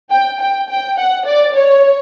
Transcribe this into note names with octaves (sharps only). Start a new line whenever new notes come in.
G5
G5
G5
F#5
D5
C#5